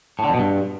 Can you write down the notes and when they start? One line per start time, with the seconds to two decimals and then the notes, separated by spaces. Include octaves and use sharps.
0.19 A2
0.24 D3
0.29 F2
0.34 B2
0.39 G2